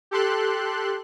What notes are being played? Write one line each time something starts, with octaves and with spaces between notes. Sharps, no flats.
G4 A4 C6 F#6